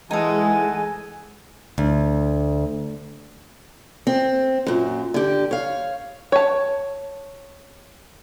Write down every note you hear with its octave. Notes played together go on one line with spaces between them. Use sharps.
E3 G#3 D#4 G#4 A4 F#5 G#5
D2
C4
F#2 A#2
D3 G4
C#5 F5
C#5 A5